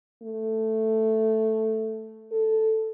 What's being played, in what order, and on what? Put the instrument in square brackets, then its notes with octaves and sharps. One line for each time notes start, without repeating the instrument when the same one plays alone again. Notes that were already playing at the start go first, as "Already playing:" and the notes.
[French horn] A3
A4